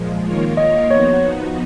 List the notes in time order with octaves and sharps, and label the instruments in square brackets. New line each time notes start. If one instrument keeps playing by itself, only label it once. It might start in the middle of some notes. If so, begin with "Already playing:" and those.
Already playing: [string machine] A#2 F3 G#3
D#3 A#3 F4 A#4 C#5
[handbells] D#5
[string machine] F3 B3 D#4 F#4 [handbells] C#5